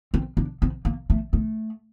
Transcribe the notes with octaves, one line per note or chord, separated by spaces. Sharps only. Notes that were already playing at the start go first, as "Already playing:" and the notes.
C4
D4
C4
A#3
A3
A3